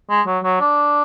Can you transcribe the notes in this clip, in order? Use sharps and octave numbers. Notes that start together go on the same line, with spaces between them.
G#3
F#3
F#3
D4